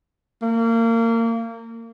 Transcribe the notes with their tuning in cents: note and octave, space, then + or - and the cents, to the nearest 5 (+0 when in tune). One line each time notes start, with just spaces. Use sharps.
A#3 -30